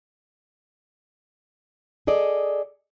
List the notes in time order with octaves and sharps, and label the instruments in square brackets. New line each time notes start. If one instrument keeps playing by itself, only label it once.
[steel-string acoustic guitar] G#4 A4 D5 D#5